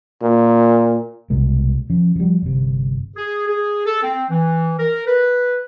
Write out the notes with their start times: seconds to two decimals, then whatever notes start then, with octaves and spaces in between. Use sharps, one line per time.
0.22 A#2
1.30 C2 B2 G#3
1.90 F3 C#4
2.16 F3 G3
2.42 G1 C3
3.17 G#4
3.47 G#4
3.85 A4
4.03 C4
4.31 E3
4.79 A#4
5.06 B4